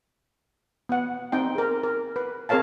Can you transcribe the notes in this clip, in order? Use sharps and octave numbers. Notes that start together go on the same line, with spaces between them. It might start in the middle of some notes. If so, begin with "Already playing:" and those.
B3 F#5
C4 D#4 G5
G#4 A#4
A#4
B4
C4 G#4 A#4 C#5 F5 A5